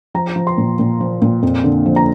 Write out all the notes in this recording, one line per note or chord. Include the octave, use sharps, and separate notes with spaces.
F3 A#5
F3
C6
A#2
A#2
F3
A#2
F2
D3
F3
A#5